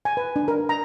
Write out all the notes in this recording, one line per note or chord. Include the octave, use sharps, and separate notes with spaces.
G#5
B4
D4
A#4
A#5